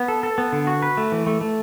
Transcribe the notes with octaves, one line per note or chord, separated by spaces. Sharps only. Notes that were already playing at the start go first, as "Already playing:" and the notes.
Already playing: B3
A4
A4
B3
D3
F#4
B4
A3
E3
A3
A3